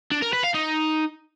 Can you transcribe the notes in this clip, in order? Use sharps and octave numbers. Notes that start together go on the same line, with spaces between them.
D4
A#4
B4
F5
D#4